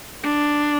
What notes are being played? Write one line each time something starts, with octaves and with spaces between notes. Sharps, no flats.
D4